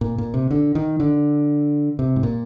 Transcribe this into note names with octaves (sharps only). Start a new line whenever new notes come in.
A#2
A#2
C3
D3
D#3
D3
C3
G#2
A#2